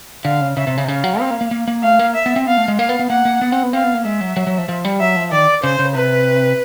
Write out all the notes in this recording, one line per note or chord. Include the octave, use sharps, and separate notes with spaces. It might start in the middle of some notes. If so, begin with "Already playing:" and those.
D3 F5
C#3
C#3 E5
C3
C#3
C3
C#3 F5
F#3
C4
A#3
A#3
A#3
A#3
A3 F5
A#3
E5
B3
C4
B3 F5
A3
G#3
A#3 F5
B3
B3
A#3 F#5
A#3
B3
C4
B3
C4 F5
B3
A#3
G#3 E5
F#3
F#3
F#3
F3
F3
G3
F#3 E5
F3
D#3 D5
C#3 C5
C#3
C3 B4